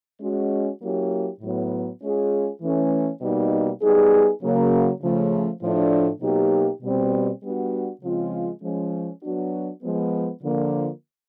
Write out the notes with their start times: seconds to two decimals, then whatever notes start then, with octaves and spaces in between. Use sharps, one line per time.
0.20 G#3 C#4 F#4
0.81 F#3 A#3 C#4 E4 G4
1.41 A2 F#3 B3
2.01 G#3 C#4 F4 G#4
2.61 E3 A3 C#4
3.21 B2 G3 A#3 D#4
3.81 G3 B3 D#4 G#4
4.41 C#3 F#3 A#3
5.01 C#3 F3 A3
5.61 A2 F3 A3 D4
6.21 B2 F#3 A#3 D#4 G4
6.81 B2 G3 C4
7.41 G3 B3 D4 F#4
8.01 C#3 F3 G#3 C4 F4
8.61 F3 G#3 C#4
9.21 F#3 B3 D4 F#4
9.81 F3 G#3 B3
10.41 D3 F3 A#3